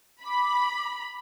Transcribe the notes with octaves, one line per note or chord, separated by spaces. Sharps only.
B5 D6